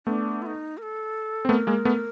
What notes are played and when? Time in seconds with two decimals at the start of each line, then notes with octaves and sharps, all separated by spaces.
0.07 A3 B3 D4
0.42 F4
0.46 D#4
0.78 A#4
0.82 A4
1.45 C4
1.49 A3 B3 A#4
1.67 G#3 A#3
1.85 A3 B3